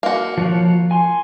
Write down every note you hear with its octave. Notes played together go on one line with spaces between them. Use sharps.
A#3 F#4
F3 C#5 F#6
G#5 C6